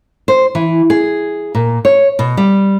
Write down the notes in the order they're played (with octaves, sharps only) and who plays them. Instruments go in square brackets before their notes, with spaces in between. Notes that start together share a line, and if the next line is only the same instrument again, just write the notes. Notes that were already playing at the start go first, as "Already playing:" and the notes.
[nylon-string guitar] C5
E3
G#4
A#2
C#5
B2
G3